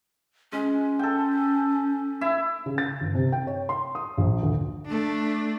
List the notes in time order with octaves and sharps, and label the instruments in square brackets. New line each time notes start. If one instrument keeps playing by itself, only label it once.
[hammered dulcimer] G#3 [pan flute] C#4
[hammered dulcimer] A4 G5
E4 E5
[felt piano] C#3
A6
G1
C3
G5
C#5
C6
D#6
A#1
D2
[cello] A3 D4